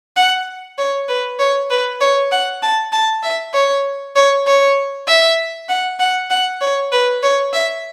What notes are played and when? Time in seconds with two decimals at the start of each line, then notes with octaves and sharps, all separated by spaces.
0.16 F#5
0.78 C#5
1.08 B4
1.39 C#5
1.70 B4
2.01 C#5
2.32 F#5
2.62 A5
2.92 A5
3.23 E5
3.54 C#5
4.16 C#5
4.47 C#5
5.08 E5
5.69 F#5
6.00 F#5
6.30 F#5
6.61 C#5
6.92 B4
7.23 C#5
7.53 E5